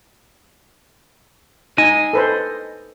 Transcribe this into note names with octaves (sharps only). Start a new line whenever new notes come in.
D#4 D#5 G#5
A4 B4 C5